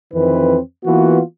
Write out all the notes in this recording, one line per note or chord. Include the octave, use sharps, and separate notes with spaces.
F2 D#3 E3 C4 B4
E3 A#3 B3 F4 F#4